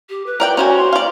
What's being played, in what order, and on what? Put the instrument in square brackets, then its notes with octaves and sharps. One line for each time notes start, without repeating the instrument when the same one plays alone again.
[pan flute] G4
B4
[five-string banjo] A#4 D5 G5
[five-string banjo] C#4 C5 G#5 [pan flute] F#4
[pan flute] C6
[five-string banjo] D5 F5